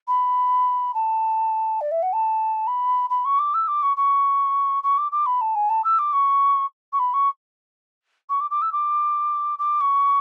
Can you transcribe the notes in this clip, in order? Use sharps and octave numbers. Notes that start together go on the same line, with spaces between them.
B5
A5
D5
E5
F#5
A5
B5
B5
C#6
D6
E6
D6
C#6
C#6
C#6
D6
D6
B5
A5
G#5
A5
E6
D6
C#6
C#6
B5
C#6
C#6
D6
D6
E6
D6
D6
C#6